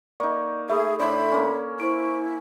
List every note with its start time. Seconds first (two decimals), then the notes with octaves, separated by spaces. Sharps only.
0.20 A#3 D#4 D5 C#6
0.70 A3 G#4 E5 B5 D#6
1.00 A2 D4 C5 D5 B5
1.32 A#3 C#4
1.80 E4 C5 C#6 D7